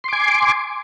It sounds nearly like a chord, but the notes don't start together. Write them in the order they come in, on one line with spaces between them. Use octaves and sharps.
C6 D6 G#5